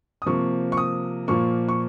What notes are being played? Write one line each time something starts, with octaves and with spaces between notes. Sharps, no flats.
D#6
C3 F3 A#3 C#6
C#6
D#6
A#2 F3 A#3 C#6
C#6